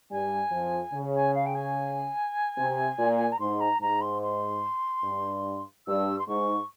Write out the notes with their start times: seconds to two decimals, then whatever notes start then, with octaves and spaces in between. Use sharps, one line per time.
0.11 G2 G3 G#5
0.51 F2 F3
0.93 C#3
1.14 G#5
1.34 F5
1.46 G5
1.54 G#5
2.58 C3
2.99 A#2
3.32 A#5
3.39 G#2 C6
3.60 A#5
3.81 G#2 A#5
4.01 C6
4.22 C6
5.04 G2
5.87 G2 E6
6.18 C6
6.27 G#2 C#6